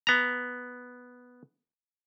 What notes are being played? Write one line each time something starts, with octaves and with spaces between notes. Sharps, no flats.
B3 A#5